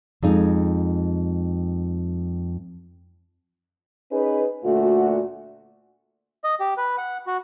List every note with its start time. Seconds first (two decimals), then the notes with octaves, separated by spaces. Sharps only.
0.23 F2 G#3 D#4
4.12 C#4 D#4 G#4 B4
4.65 D2 A#2 A3 F#4
6.44 D#5
6.60 G4
6.77 B4
6.98 F#5
7.27 F#4